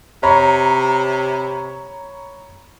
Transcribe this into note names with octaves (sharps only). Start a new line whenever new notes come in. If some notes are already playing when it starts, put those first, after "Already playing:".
C3 C#5 A#5 B5